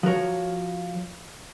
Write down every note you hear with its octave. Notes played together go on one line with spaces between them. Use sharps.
F3 F#4 A#4 C#5